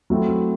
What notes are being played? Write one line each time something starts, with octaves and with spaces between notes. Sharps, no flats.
F#3 A3 C4 E4